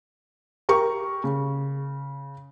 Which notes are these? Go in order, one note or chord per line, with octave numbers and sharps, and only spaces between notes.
G4 A#4 C#6
C#3